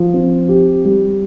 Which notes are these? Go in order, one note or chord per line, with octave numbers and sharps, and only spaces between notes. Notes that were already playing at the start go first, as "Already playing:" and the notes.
Already playing: F3
C4
G4
G3